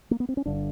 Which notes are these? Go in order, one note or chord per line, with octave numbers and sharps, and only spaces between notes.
A#3
B3
C4
C#4
G1 G2 D3 D4